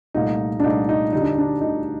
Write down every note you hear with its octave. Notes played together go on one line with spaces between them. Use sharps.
C2 A#2 A3 D#4
D4
C2 A#2 A3 D#4
D#4
D2 D3 G3 D#4
D4
D4
D2 D3 G3 D#4